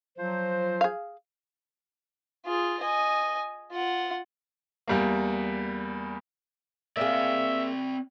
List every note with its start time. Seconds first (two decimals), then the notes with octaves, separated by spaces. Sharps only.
0.18 F3 F#3 C5
0.81 G#4 F5
2.46 F4 G#4
2.80 D#5 G#5
3.72 F4 F#5
4.87 E2 G3 A#3
6.97 A#3 C4 G#4 D5 E5